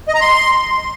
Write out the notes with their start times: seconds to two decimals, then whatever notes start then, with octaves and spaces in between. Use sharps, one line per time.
0.08 D#5
0.14 A#5
0.21 C6